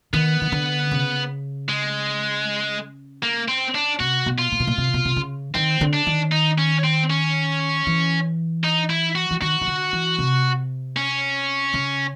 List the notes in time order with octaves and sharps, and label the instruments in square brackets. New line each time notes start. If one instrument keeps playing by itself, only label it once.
[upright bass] D#3 [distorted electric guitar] B3
[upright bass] D#3
D3
C#3
[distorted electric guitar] G#3
A#3
C4
D4
[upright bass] C3 [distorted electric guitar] F#4
[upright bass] B2
[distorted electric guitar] F4
[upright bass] A#2
B2
A#2
C3
B2
C3
C#3
[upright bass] D#3 [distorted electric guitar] C4
[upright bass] D3
[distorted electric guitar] D4
[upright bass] D#3
[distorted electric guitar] D#4
C#4
C4
C#4
[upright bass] E3
[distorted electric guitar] D#4
E4
F#4
[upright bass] E3
[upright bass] D#3 [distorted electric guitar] F#4
[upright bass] D#3
D3
E3
C3
[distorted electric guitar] C#4
[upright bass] C#3